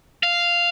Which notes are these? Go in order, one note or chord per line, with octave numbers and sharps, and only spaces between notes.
F5